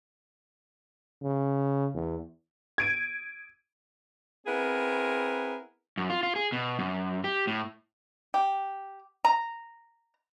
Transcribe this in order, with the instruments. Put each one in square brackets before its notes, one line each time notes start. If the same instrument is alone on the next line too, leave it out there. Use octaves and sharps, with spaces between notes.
[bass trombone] C#3
E2
[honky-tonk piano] G#6 D7 D#7
[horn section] B3 C4 E4 G#4 A#4
[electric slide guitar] F#2
F4
F4
G#4
B2
F#2
G4
A2
[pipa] G4
A#5